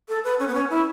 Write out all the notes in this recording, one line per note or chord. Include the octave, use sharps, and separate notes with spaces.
A4
B4
C#4
B3
C#4
E4